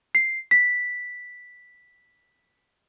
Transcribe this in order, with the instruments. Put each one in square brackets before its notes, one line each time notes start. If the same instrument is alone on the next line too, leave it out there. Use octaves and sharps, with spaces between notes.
[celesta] C7
B6